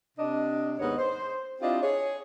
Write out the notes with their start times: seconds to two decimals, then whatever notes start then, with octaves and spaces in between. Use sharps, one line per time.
0.18 C3 D4 D#5
0.79 D#2 G#2 B3 D#4 C#5 D#5
0.98 C5
1.61 C4 D4 E4 F4 G4 D#5
1.81 G#4 C#5